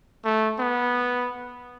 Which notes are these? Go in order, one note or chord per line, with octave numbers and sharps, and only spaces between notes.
A3
B3